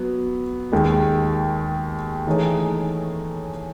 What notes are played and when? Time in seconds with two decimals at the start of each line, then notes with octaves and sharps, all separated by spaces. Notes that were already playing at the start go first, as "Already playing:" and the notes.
Already playing: F#3 B3
0.72 D#2 D#3 G#3
2.27 E3 A3 D#4 G#4 C#5